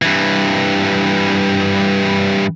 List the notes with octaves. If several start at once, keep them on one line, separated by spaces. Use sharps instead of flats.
G2 E3